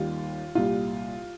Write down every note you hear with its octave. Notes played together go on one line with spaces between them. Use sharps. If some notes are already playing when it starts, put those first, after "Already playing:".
Already playing: D#2 D#3 G3 F4
C2 A#2 G3 F4